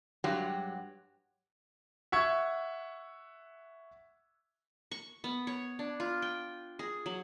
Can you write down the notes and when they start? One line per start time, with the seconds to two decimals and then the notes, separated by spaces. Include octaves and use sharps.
0.24 G2 F#3 G#3 F#4 G4
2.12 E5 F#5 C#6 G#6
4.91 C#6
5.24 B3
5.47 C#5
5.79 D4
6.00 F4
6.22 G5
6.79 G#4
7.06 F#3